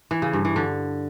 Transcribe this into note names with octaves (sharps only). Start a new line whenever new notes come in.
E3
C#3
G2
E3
D3